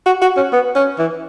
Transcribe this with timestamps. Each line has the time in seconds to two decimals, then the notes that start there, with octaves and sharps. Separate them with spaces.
0.06 F#4
0.22 F#4
0.37 C#4
0.53 B3
0.76 C#4
0.99 E3